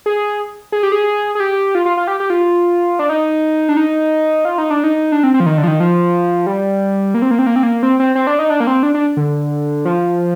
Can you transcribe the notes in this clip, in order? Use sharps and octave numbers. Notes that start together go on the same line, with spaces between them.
G#4
G#4
G4
G#4
G#4
G4
F4
F4
F4
G4
G4
F4
D4
D#4
D4
D#4
F4
D#4
D4
D#4
D4
C4
C4
F3
D#3
D3
F3
D#3
F3
G3
A#3
C4
A#3
C4
A#3
C4
A#3
C4
C4
C4
D4
D#4
D4
A#3
C4
D4
D4
D3
F3